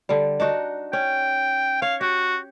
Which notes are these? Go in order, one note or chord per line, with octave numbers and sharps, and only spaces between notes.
D3 G3
D4 D#4 F#4
C#4 G5
C#5 F5
F#4 G4